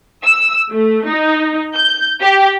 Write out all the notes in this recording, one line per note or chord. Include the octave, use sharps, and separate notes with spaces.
E6
A3
D#4
G6
G4